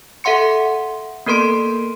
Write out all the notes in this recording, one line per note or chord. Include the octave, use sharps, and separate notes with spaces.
A4 E5 F#5 C6 C#7
A#3 B3 A4 A#4 C6 D7